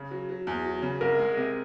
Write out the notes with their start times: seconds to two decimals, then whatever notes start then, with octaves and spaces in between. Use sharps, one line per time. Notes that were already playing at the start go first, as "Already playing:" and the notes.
Already playing: C#3
0.11 F#3
0.29 F#3
0.47 E2
0.65 F#3
0.82 C#3
1.01 C2 A#4
1.19 G#3
1.37 C3